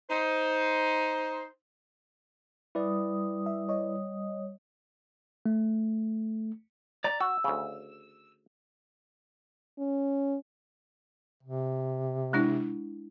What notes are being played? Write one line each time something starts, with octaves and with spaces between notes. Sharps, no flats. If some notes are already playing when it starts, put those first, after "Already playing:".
D#4 C5
G3 E4 B4 D5 D#6
E5
C#5 D#5
A3
D5 A#5
F#4 E6
D2 C#3
C#4
C3
G#3 D4 E4